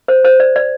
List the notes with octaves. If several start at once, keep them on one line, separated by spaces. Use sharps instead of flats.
C5
C5
D5
D5